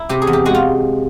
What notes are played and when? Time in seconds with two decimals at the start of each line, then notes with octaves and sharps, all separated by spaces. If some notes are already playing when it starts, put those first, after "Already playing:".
Already playing: E4
0.09 C3 G4
0.22 G#4
0.27 E2
0.33 G4
0.46 G#3 F#4
0.55 F4